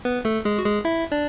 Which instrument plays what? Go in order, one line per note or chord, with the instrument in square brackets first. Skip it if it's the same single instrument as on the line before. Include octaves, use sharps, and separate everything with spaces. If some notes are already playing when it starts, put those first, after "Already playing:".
[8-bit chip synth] B3 B4
A3 A4
G#3 G#4
F#4
G#3 G#4
E4 E5
D4 D5